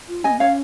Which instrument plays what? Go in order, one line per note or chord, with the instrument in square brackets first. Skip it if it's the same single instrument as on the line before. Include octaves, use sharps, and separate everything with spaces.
[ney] F4
[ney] C#4 [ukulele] D#5 G#5
[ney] A#3
[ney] C#4 [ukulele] C#5 F5